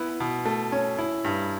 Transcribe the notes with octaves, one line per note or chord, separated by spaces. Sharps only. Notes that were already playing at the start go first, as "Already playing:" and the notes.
Already playing: B3 E4
B2
A3
C#4
E4
G2